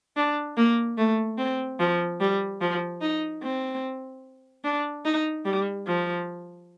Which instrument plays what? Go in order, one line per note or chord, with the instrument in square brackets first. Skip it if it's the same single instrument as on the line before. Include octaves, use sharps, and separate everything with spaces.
[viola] D4
A#3
A3
C4
F3
G3
F3
D#4
C4
D4
D#4
G3
F3